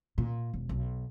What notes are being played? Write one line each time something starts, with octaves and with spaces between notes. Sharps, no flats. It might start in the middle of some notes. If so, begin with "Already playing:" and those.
A#2
E1
B1